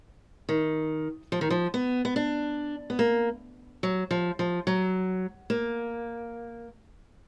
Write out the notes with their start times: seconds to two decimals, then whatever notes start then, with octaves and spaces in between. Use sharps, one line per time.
0.49 D#3
1.32 F3
1.41 D#3
1.50 F3
1.74 B3
2.05 B3
2.16 D4
2.90 B3
2.99 A#3
3.83 F#3
4.11 F3
4.39 F3
4.67 F#3
5.50 A#3